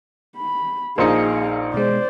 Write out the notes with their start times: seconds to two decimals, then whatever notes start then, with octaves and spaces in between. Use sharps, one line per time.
0.37 B5
0.98 A#1 A#3 D#4 G#4 C5 F5 C#7
1.74 B2 G#3 C5 D5